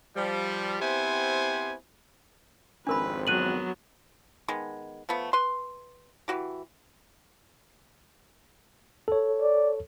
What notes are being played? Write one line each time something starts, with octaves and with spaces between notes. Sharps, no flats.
F3 G3
B3 C4 E4 G4 C5 G#5
G#1 F2 C4 D4 A#4 B4 B5
F#3 B3 F#6 D#7 F#7
D#3 G#3 B3
F3 A3 B3
B4 C6
E3 F#4 G4
A4 C#5
D5